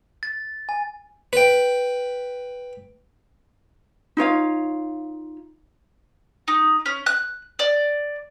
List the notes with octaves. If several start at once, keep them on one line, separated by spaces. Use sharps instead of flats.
A6
G#5
B4 G5
D#4 F4 C#5 F5
D#4
C#4
F#6
D5